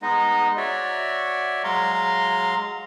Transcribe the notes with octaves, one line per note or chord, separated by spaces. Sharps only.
G#3 B3 D#4 D#5
F#4 C#5 D5 E5
F#3 G#3 F5 A#5 C6